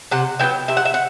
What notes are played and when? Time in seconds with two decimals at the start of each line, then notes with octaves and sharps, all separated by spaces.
0.11 C3 F#5
0.39 F#3 B3 E4 G5
0.68 C3 E5
0.77 F#5
0.85 E5
0.94 F#5